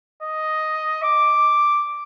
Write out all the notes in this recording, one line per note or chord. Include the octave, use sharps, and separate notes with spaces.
D#5
D6